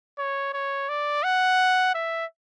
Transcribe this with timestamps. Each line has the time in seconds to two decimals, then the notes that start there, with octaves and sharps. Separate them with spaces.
0.18 C#5
0.53 C#5
0.89 D5
1.23 F#5
1.94 E5